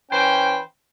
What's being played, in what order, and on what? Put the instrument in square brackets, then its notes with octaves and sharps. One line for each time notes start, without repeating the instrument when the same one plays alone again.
[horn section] E3 C#4 C5 G5